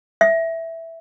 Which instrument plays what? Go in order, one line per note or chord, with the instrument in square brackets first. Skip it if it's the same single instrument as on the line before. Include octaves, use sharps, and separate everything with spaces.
[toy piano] E5